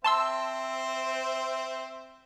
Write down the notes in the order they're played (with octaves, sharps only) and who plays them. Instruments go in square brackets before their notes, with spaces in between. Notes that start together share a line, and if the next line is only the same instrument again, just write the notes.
[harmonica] C4 C5 E5 [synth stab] A5 C6 E6